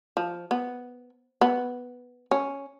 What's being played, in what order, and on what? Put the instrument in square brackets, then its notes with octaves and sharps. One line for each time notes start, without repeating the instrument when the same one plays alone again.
[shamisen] F3
B3
B3
C#4